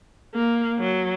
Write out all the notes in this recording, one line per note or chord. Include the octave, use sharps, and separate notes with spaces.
A#3
F#3